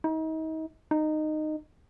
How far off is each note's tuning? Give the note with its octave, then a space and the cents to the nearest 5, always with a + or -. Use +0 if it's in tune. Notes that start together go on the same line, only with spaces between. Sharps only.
D#4 +35
D#4 -15